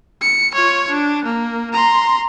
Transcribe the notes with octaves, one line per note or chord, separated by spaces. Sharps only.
C#7
F4 C#5
D4
A#3
A#5 C6